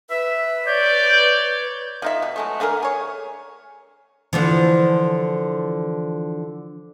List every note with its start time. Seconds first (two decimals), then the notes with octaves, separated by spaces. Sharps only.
0.10 B4 E5
0.67 C#5 D5 G6
2.02 F3 D#4 E5
2.22 B2
2.36 F#3 G#3 A3
2.60 D3 A3 G#4 A#4
2.82 G#4 C#5
4.33 D3 E3 F3